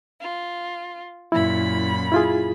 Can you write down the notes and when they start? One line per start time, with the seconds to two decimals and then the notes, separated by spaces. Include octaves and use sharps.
0.20 F4
1.32 F#2 A#2 E4 B5
2.12 E4 F4 G#4